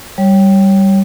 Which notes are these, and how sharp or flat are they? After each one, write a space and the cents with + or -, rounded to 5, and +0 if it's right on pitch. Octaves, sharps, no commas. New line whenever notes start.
G3 -5 C#5 -5